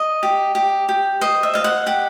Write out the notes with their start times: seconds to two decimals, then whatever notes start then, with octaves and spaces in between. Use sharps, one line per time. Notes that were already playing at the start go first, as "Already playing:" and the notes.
Already playing: D#5
0.23 G4
0.55 G4
0.89 G4
1.21 C5 D#5
1.43 E5
1.54 D#5 F5
1.64 F#5
1.86 G4 F#5